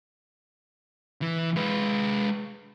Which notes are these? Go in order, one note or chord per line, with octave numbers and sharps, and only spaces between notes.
E3
G#3 B4